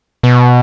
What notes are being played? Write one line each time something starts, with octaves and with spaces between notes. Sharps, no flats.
B2